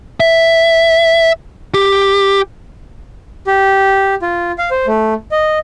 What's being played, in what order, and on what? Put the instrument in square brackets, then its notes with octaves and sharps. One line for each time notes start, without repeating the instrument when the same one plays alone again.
[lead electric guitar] E5
G4
[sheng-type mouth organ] G4
F4
F5
C5
A3
D#5